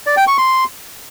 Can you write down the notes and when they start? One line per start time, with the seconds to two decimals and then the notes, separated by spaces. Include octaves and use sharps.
0.06 D5
0.17 G5
0.27 C#6
0.38 C6